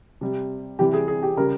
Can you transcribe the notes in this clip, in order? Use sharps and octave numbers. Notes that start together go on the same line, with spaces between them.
C3 G3
C3 E3 G3 G4
G#4
G#4
G4
C#3 G3 A#4